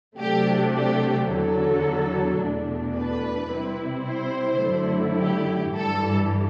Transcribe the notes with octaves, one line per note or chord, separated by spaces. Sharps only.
C3 F#3 A3 D4 G4
G4
E2 D3 F#3 A4
E2 B2 A3 D4
B4
C3 G3 C4 E4
C5
F#2 D3 F#3 A3 E4
G4
G2 E3 G3 A4